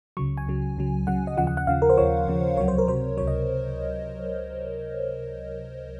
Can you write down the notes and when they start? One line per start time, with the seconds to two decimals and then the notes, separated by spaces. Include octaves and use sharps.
0.17 C#2 C#3 F#3 C#6
0.37 G#5
0.47 C#2 C#3 F#3
0.77 C#2 C#3 F#3
1.07 C#2 C#3 F#3 F#5
1.27 D#5
1.37 D#2 C#3 F3 F#5
1.47 F#5
1.57 F#5
1.67 D#2 C#3 F3 F5
1.82 A#4
1.90 C5
1.97 D#2 C#3 F3 C#5
2.27 D#2 C#3 F3
2.57 C#2 C3 F#3 C#5
2.68 C5
2.78 A#4
2.87 C#2 C3 F#3 C5
3.17 C#2 C3 F#3 C#5
3.27 D#5